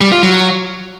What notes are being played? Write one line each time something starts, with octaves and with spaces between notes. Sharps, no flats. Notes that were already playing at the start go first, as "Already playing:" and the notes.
G3
F4
F#3